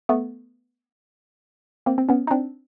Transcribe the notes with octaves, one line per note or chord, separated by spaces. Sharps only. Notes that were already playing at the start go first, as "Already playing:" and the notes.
A3 B3
A#3 C4
C4
B3 C#4
D#4
C4 D4